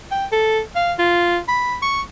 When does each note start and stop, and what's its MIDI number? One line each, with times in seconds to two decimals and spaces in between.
0.11 0.26 79
0.32 0.60 69
0.75 0.93 77
0.99 1.39 65
1.48 1.76 83
1.82 2.02 85